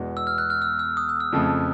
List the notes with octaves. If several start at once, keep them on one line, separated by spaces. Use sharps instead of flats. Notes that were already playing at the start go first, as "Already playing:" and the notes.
Already playing: E2 B2 G#3
E6
F6
F#6
F6
E6
E6
D#6
E6
E6
F2 C#3 F3 A3